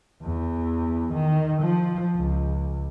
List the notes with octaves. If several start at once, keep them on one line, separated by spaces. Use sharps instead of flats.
E2
D#3
F3
C#2